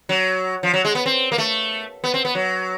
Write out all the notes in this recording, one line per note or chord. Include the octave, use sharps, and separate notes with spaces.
F#3
F3
F#3
G#3
B3
C4
A#3
A3
B3
C4
B3
F#3